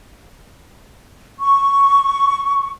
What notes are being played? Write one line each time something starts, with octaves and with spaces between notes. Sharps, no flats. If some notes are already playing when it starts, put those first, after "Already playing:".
C#6